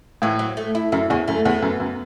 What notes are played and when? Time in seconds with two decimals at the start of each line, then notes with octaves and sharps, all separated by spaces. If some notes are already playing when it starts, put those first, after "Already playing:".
0.22 A2 E3
0.39 F#3
0.57 A3
0.75 E4
0.92 F#2 E4
1.10 E2 C#4
1.28 F#2 A3
1.45 E2 B3
1.62 F#2
1.80 F#2